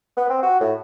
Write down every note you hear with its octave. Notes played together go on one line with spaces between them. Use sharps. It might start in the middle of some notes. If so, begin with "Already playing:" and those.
B3
C4
F#4
A2